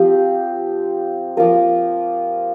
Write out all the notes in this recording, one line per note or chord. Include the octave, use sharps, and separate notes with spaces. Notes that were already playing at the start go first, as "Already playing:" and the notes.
Already playing: F3 C4 G4
F3 A#3 F4 A#4